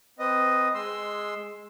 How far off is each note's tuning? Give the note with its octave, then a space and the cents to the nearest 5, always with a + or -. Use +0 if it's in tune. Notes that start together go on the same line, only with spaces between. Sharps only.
C4 -10 B4 +0 D#5 +0
G#3 +0 C6 +5 E6 +0